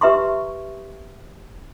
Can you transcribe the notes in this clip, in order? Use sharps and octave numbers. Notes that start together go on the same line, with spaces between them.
G4 B4 E5 A#5 C6 C#6